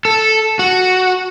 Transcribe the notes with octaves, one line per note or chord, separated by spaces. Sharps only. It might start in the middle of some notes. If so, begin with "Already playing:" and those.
A4
F#4